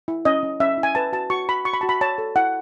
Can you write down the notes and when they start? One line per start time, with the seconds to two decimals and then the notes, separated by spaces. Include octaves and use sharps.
0.08 E4
0.25 C#4 D#5
0.43 C#4
0.60 C#4 E5
0.77 E4
0.83 G#5
0.95 B4 A5
1.12 F#4 A5
1.30 F#4 C#6
1.49 F#4 B5
1.65 F#4 C#6
1.74 B5
1.81 F#4 A5
1.89 B5
2.01 C#5 A5
2.18 A4
2.36 E4 F#5